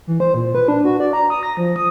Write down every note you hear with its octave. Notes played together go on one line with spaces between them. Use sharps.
E3
C5
A#2
B4
D4
F#4
D5
A#5
D#6
A#6
F3
D#6